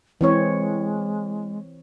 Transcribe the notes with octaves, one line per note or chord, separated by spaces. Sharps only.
E3 G#3 C4 C#5